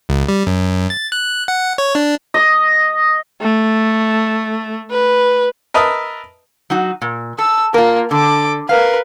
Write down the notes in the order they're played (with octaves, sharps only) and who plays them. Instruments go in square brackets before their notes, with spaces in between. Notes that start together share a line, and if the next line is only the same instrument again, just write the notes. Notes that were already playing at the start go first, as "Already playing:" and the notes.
[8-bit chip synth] C#2
G3
F#2
A6
F#6
F#5
C#5
D4
[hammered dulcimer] D#5
[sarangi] A3
B4
[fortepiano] A#4 B4 D#5 E5 A5 D#6
[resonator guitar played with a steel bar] F#3 D#4 F#4
A#2
[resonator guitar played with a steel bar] A4 [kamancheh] E6
[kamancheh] A#3 [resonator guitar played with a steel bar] F4 A#4
[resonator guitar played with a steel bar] D3 [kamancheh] A4 D6
[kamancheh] A#4 B4 [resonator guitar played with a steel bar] F5